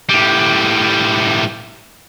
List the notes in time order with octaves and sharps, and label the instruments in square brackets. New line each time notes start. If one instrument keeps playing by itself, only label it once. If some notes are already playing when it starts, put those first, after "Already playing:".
[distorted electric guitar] A2 G3